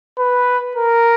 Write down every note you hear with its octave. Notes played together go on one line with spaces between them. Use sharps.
B4
A#4